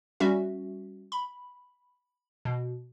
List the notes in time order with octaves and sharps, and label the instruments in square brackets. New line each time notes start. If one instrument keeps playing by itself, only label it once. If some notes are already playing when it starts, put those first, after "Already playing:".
[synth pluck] G3 C#4 F#4 E5
B5
B2